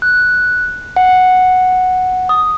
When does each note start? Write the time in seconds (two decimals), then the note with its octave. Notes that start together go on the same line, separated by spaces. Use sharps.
0.02 F#6
0.96 F#5
2.29 D#6